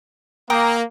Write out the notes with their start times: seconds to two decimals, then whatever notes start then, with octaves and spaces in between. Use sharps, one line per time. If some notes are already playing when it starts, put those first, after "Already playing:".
0.50 A#3 A#4 G5 D#6